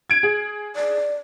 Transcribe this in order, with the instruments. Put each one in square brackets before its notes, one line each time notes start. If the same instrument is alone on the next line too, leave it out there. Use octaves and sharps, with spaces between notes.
[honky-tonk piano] G#6 D7
G#4
[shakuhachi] D5